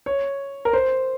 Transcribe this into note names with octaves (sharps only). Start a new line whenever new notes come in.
C#5
A#4
C5